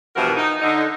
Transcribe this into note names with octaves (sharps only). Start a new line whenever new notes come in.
G2 B2 E3 F3 F#4 A#4
D#4
D3 D#4